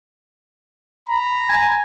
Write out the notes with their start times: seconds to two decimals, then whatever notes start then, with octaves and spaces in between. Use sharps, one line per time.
1.08 A#5 B5
1.49 G#5